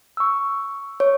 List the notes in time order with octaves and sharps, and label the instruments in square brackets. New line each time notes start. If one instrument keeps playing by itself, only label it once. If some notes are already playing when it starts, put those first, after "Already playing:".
[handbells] C#6 E6
[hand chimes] C#5 [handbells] C#6